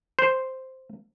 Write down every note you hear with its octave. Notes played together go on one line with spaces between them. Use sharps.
C5